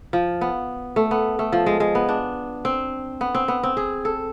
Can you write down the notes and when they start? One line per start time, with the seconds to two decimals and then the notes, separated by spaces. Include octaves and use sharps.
0.13 F3
0.41 B3
0.96 A3
1.11 B3
1.39 A3
1.52 F3
1.66 G#3
1.80 G#3
1.95 B3
2.09 D4
2.65 C4
3.21 B3
3.35 C4
3.48 B3
3.63 C4
3.77 G#4
4.05 A4